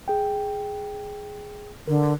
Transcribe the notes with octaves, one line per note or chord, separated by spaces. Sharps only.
G#4 G5
D3 A#4